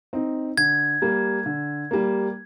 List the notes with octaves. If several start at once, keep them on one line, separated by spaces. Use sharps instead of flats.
C4 D#4
D3 G#6
G3 A#3
D3
G3 A#3